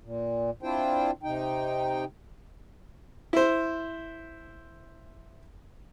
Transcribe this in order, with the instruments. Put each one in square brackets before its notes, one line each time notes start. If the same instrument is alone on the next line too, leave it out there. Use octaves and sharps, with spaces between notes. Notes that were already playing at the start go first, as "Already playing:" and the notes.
[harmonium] A#2
C4 D4 E4 F4 C5 G5
C3 D#4 G5
[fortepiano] E4 C5